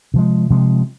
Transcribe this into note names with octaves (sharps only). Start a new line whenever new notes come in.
C3 F3 G#3
C3 F3 G#3